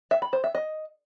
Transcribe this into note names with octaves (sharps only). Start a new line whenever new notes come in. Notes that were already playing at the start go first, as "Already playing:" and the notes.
E5
B5
C5
E5
D#5